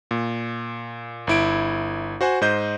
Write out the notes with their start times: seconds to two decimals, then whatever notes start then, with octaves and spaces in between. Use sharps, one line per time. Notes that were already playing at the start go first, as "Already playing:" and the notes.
0.11 A#2
1.27 G1 E4 D7
2.21 F#4 C5 F#5 G#5
2.41 G#2 C5 D#5 G6